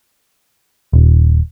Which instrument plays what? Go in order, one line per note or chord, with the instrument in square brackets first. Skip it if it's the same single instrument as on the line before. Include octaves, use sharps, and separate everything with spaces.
[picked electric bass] D#1